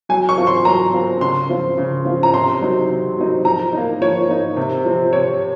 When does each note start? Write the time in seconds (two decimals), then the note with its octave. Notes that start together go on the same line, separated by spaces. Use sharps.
0.09 F#3 G#5
0.29 C#6
0.38 C4 F4
0.47 C6
0.65 F#3 A#5
0.93 C4 F4
1.21 C#3 C6
1.49 F3 C4 F4
1.78 C#3
2.05 F3 C4 F4
2.23 A#5
2.34 C3 C6
2.61 F#3 C4 D#4
2.89 C3
3.17 F#3 C4 D#4
3.45 F3 A#5
3.73 A#3 D#4
4.01 F3 C#5
4.29 A#3 D#4
4.57 C3
4.85 F3 C4
5.13 C3 C#5